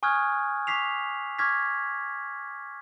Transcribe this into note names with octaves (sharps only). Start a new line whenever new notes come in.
G#5 C#6 D#6 F6 F#6 G#6
C#6 D6 B6 C7 F7
C#6 D6 F6 G#6 A#6 B6